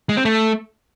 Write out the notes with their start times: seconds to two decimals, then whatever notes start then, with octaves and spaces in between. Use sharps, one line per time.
0.09 G#3
0.17 C4
0.25 A3